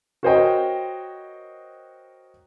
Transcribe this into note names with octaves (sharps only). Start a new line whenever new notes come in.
F#4 A#4 C5 C#5 D#5 G5